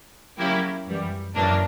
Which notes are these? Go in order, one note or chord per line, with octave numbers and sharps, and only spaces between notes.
C#3 F#3 A#3 E4 G4
F#2 E3 G3
F#2 C#3 E3 A#3 D4